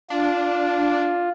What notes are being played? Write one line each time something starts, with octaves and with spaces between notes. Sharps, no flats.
D4 F4